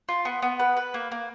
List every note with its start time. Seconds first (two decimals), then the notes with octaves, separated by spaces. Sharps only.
0.09 F4
0.25 B3
0.42 B3
0.59 B4
0.77 B4
0.94 A#3
1.12 A#3